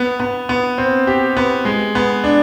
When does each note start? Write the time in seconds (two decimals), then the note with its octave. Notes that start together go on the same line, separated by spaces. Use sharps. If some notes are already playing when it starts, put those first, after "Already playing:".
Already playing: B3
0.20 B3
0.49 B3
0.78 C4
1.07 G4
1.37 B3
1.65 G#3
1.95 B3
2.24 D4